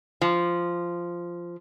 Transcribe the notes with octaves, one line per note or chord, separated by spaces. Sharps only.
F3